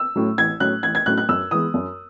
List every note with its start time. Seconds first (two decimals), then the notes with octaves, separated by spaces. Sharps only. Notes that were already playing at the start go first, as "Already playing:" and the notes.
Already playing: E6
0.16 A2 F#3 C#4
0.38 A1 G#6
0.60 A2 F#3 C#4 F#6
0.83 A1 G#6
0.95 G#6
1.06 A2 F#3 C#4 F#6
1.17 F#6
1.29 F#2 E6
1.51 E3 G#3 B3 D#6
1.74 F#2